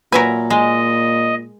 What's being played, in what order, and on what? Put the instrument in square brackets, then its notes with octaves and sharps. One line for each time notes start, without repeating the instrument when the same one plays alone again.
[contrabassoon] A#2 [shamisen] F#3 B4 [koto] A#4 E5 G#5
[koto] G#3 [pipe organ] D#5